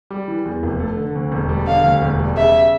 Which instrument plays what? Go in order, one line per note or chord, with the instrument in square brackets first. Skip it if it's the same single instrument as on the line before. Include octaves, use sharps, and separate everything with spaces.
[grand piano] G3
E3
E2
F1
A3
D3
D2
E1
G3
[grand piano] D3 [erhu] F5
[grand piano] D2
E1
G3
[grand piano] C#3 [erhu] E5